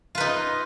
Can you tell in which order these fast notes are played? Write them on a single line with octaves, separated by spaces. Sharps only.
F4 B4 D#4